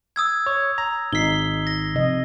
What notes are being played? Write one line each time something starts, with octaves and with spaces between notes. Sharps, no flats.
D#6 E6 G#6
C#5
A#5
G#1 D#4 B6 C7 G7
A#6
C3 F3 D#5